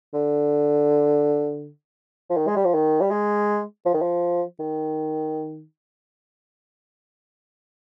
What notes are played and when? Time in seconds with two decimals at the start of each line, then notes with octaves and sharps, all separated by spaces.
0.14 D3
2.30 F3
2.37 D#3
2.47 G#3
2.56 G3
2.65 F3
2.74 D#3
3.01 G3
3.11 G#3
3.86 F3
3.94 D#3
4.02 F3
4.60 D#3